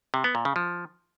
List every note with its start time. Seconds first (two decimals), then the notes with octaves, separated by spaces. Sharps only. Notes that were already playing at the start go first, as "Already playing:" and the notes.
0.14 C3
0.24 B3
0.35 A#2
0.45 C#3
0.56 F3